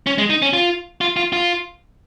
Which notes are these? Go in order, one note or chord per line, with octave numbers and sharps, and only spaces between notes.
C#4
G#3
D#4
C#4
F4
F4
F4
F4